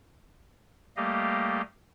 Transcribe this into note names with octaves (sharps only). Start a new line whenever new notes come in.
G3 A3 A#3 G4 D#5 F5